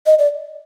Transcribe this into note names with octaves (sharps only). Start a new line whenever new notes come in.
D#5
D5